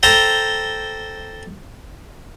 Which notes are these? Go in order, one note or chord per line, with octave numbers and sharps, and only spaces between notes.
A4 C5 G5 A#5